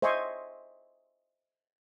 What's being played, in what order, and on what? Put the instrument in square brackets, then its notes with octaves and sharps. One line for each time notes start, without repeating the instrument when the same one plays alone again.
[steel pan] C5 D#5 E5 G#5 C6 C#6